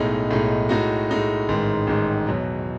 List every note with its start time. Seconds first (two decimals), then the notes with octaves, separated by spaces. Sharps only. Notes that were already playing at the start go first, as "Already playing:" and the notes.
Already playing: B1 A2 G#3 D#4
0.30 B1 A2 G#3 D#4
0.69 A2 G#3 D#4 F#4
1.09 A2 G#3 D#4 F#4
1.48 A1 G#2 D#3 G#3
1.87 A1 G#2 D#3 G#3
2.27 E2 B2 F#3